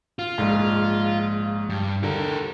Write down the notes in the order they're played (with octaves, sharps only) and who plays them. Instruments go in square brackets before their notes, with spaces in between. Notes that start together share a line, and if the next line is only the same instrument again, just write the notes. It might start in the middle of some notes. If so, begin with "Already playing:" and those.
[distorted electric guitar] F4
[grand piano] A#1 G#2
[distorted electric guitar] G2
[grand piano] D3 [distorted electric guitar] G4 A#4